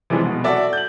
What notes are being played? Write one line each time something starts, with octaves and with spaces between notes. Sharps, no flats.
C3 E3 F3 G3 G#3
B2
F#4 A4 D5 E5
G6 F#7